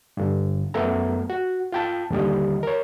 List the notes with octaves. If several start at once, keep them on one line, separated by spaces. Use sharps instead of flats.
G2 D3
F#2 A3 B3 A4 A#5
F#4
F4 G5 A5
D#2 D3 G3 D#5
A#4 C#5